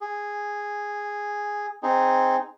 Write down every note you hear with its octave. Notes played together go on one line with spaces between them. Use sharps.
G#4
C4 D#4 G#4